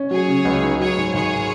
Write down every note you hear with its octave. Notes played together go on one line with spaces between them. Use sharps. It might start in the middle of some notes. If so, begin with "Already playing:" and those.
Already playing: C#4
F#3 G#4 C#5
C#3
C#2
D#4
F#3 G#4 C#5
G#2
G#1 G#4 C#5